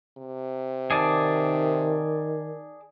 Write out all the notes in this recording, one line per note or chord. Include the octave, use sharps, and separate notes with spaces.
C3
D#3 G#4 D5 A5